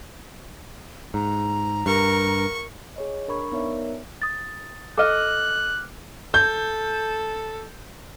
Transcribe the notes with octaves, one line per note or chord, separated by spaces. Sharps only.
G#2 A#5
G2 A#4 C#6
G#4 C#5 D#5
D4 A#4 B5 C#6 G#6
B3 D#4 A#4 C#5 D5 E5
D#6 A6
A4 D#5 D6 F6 F#6
A4 G6